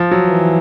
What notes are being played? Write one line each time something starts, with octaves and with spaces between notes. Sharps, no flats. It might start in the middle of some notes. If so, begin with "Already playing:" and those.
Already playing: F3
F#3
E3